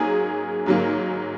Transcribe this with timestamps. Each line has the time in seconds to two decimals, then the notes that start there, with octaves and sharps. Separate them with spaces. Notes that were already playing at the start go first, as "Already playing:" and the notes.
Already playing: G#2 F#3 A#3 G#4 G#5
0.66 G#2 F#3 A#3